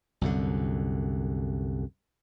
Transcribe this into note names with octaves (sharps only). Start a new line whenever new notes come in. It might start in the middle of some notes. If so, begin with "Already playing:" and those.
C2 F#2 D3